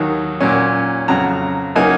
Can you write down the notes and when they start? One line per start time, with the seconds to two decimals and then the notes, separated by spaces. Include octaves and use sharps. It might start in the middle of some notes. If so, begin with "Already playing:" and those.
Already playing: D#2 D#3 F#3
0.41 A#2 F#3 C#4
1.08 F2 C#3 F#3 A#5
1.75 C#3 F#3 A#3 D#4 G#5